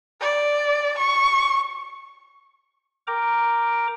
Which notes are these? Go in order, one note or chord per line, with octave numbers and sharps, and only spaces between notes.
D5
C#6
A#4 G5 A#5 D6